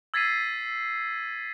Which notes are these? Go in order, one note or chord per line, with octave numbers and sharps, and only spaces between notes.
E6 G#6 A6 B6 C7 D#7